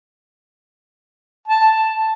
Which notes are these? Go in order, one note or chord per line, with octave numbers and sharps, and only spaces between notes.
A5